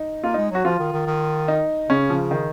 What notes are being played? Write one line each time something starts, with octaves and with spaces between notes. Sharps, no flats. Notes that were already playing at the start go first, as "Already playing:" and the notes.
Already playing: D#4
A#3 F4
G#3 D#4
F#3 F#4
F3 F4
D#3
D#3
D#3
D#4
C#3 C#4
F3
D#3